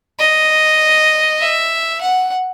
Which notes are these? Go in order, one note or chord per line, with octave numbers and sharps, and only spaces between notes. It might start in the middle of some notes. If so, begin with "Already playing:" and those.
D#5
E5
F#5